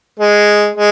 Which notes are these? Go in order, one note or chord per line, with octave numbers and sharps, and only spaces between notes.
G#3
G#3